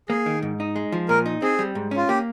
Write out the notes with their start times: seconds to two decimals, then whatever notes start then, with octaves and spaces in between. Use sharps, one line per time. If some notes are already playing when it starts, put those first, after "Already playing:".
0.09 A#3 G#4
0.26 D#3
0.42 G#2
0.60 D#4
0.76 G#3
0.92 F3
1.09 A#2 A#4
1.26 D#4
1.42 C4 G#4
1.59 G3
1.75 G#2
1.91 C#4
1.97 F4
2.08 A#3 G4